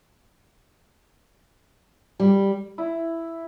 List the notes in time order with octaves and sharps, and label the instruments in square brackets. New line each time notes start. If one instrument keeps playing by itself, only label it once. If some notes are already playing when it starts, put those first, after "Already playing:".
[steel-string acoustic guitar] G3
[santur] E4